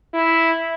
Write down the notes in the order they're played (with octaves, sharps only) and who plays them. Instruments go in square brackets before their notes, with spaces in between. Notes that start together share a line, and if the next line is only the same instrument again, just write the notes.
[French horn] E4